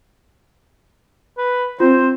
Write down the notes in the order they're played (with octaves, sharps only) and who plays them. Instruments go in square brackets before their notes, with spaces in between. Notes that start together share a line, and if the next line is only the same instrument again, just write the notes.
[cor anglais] B4
[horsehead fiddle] C4 [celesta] F4 [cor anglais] C5